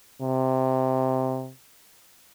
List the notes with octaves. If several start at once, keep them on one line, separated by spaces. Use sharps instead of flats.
C3